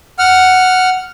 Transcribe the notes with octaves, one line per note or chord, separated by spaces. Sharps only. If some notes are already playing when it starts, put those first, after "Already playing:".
F#5 F6